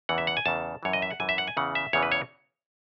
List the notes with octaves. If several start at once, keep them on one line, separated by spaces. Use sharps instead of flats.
E2 C#3 E3 F#5
E5
F#5
G#5
E2 C#3 E3 A5
F#2 E3 C#5
D#5
E5
F#5
F#2 E3 G#5
E5
F#5
G#5
E2 C#3 E3 F#5
E5
E2 C#3 E3 C#5
B4
C#5